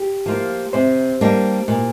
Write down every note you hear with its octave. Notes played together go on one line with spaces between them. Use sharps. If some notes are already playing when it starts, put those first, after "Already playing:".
Already playing: G4
F3 A#3 F4
C3 C5
G3 A#3 D4
A#2